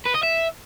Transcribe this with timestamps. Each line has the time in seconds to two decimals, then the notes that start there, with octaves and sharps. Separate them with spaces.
0.06 B4
0.15 D#5
0.23 E5